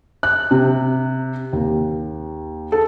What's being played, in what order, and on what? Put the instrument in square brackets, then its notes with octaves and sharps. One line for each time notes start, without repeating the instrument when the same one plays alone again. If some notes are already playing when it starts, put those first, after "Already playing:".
[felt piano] F#6
C3
D#2
A4